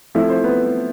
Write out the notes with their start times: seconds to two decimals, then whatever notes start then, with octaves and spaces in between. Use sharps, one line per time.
0.15 F3 A3 C4 E4 E5
0.29 C4 C5
0.44 B3 B4